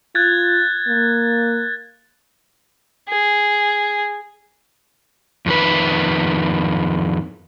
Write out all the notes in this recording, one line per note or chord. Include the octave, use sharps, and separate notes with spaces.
F4 F#6 G#6 A6
A#3
G#4
F2 D#3 B4